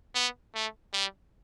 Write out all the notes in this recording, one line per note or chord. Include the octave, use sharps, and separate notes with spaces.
B3
A3
G3